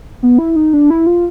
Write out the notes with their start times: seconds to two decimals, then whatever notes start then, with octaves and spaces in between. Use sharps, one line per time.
0.23 B3
0.38 E4
0.56 D#4
0.73 D4
0.90 E4
1.07 F4